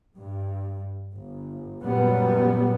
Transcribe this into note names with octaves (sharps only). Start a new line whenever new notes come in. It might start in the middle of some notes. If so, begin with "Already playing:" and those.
G2
G1
F#2 A#2 G3 B3